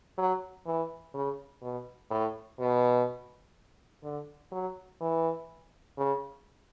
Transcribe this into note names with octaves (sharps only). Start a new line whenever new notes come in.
F#3
E3
C#3
B2
A2
B2
D3
F#3
E3
C#3